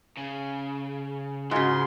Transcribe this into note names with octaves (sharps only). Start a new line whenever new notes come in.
C#3
G#2 C#3 F4 F#4 G#4 C6